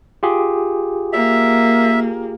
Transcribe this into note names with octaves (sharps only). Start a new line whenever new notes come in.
F4 G4 G#4
A#3 E5